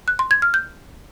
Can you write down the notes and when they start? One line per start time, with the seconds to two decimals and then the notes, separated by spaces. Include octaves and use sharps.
0.08 F#6
0.19 C6
0.31 G#6
0.42 F6
0.54 G6